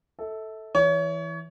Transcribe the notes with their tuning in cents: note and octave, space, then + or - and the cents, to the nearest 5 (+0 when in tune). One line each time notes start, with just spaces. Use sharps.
A4 +0 E5 -35
E3 +0 C#5 +30